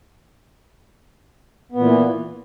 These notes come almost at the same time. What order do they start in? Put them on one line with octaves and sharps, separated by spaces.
B3 A#2 E3